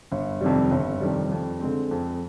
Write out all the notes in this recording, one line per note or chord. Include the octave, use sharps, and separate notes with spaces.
G1
F2 C3 D#3 G3
G1
F2 C3 D#3 G3
F2
D3 G#3 C4
F2